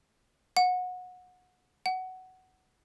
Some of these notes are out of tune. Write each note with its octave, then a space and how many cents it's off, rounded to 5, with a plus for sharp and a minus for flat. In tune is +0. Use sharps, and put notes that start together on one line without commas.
F#5 -25
F#5 +10